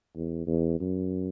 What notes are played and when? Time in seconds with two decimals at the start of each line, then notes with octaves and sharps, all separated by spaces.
0.15 E2
0.47 E2
0.80 F#2